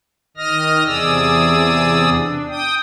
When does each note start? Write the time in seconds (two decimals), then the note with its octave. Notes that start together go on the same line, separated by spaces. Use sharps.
0.37 D#3 D#5 D#6 F6 A#6
0.85 E2 C3 G#4 D5 D#6 E6
2.12 D4
2.49 G5 D#6